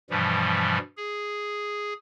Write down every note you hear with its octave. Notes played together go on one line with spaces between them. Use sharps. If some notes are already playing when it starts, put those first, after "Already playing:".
G2 B2 E3 F3 G3
G#4